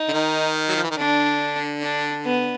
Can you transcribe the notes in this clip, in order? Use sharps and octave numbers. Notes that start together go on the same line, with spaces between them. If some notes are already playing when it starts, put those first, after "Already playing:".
Already playing: D#4
D3
D#3
F#3
F3
E3
D#3
D3 D4
D4
B3